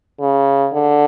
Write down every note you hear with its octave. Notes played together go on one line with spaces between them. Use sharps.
C#3
D3